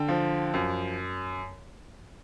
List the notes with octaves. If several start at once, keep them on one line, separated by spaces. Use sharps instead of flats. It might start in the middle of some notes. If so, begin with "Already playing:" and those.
Already playing: D3 G5
F3
F#2